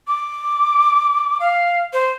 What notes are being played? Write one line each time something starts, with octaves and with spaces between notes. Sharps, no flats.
D6
F5
C5